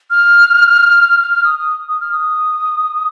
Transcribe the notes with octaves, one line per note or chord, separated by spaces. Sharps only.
F6
F6
D#6
D#6
D#6
F6
D#6